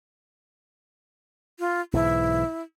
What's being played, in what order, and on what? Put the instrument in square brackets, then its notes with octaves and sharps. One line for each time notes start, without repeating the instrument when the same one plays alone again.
[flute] F4
[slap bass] B1 G#2 E3 [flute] E4